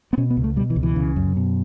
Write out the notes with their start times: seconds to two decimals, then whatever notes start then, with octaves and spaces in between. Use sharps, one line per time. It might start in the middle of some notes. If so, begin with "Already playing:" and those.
0.13 B3
0.17 B2 C#4
0.30 B3
0.37 C#2
0.44 A3
0.56 B2 G3
0.70 E3
0.76 C#2
0.83 E3
0.96 C#3
1.16 F#2
1.36 B2